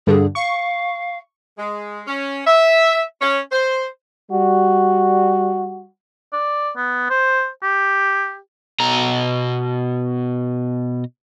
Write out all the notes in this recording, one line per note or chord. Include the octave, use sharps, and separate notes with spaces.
G2 D3 G#4
F5 C#6
G#3
C#4
E5
C#4
C5
G3 F#4
D5
B3
C5
G4
B2 A#5